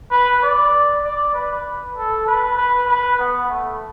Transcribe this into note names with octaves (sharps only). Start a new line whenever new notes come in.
B4
D5
D5
B4
A4
B4
B4
B4
B3
A3